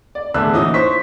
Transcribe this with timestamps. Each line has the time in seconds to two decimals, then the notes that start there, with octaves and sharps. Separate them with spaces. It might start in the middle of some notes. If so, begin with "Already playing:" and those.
0.15 D5
0.34 E2 A2 D3 A3 E6 F#6
0.53 A#2 E3 C#4 D#4 D#6
0.74 C5 C#6 B6